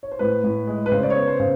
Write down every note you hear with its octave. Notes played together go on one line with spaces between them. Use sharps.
C#5
C5
A2 B4
A2
G#3
B4
C#3 C5
D5
C#5
B3
C5
C#3